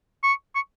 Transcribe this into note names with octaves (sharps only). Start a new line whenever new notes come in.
C#6
C#6